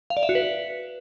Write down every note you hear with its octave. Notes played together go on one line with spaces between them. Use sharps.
F5
D5
E5
F#4
B4